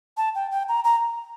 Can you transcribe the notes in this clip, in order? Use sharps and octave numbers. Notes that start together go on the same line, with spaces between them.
A5
G5
G5
A#5
A#5